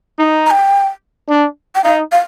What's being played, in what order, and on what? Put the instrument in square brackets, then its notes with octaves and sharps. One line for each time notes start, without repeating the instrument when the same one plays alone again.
[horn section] D#4
[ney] A#5
G5
[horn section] D4
[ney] G5
[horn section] D#4 [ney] F5
[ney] F5